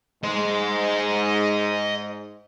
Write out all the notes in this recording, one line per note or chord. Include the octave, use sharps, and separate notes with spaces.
G#2 D#5 C6